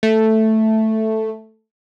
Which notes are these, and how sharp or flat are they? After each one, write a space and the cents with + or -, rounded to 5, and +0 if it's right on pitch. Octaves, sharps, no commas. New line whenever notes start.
A3 +0